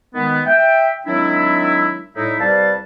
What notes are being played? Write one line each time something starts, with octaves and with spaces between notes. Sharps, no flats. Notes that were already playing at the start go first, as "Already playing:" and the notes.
D#3 G#3 B3
E5 G5
D#3 F#3 G#3 C4 D4 E4
A2 G3 D#4 E4
C2 G3 B4 D5 F5 A5